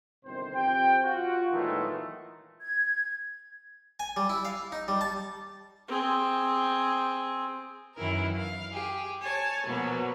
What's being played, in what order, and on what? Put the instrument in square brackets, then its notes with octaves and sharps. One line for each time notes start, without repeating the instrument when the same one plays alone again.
[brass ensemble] G1 C3 D#3 C4 C5
F2 C4 G4 G5
F4 F#4
A#2 D#3 E3 F#3 G#3 A3
[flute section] G#6
[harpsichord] G#5
G3
E4
F5
D#4
G3
A5
[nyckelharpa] C4 G#4
[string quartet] F#2 D#3 E3 E4 A#4
F5
G4 G#4
C#5 G#5 A5
B2 F3 F#3 A#3 B3